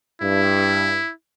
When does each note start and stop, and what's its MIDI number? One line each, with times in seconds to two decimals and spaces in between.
0.21 0.99 43
0.21 1.11 64